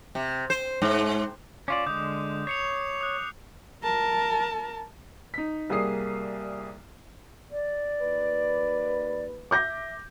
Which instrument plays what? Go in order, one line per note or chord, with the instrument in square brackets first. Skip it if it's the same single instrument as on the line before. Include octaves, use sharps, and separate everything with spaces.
[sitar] C3
C5
G#2
[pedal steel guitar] C#4 F4 D5 [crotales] D6
[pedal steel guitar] D3 G#3 [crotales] D#6 G6
[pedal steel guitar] C#5 [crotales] C7 C#7 F7
[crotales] D#6 F#6
[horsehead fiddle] A#4 A5
[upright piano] D#4 B6
C2 G3 A#3 G#4 D#6 C7
[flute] D5
[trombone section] D#2 B4
[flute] E5 [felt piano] D6 G6 A#6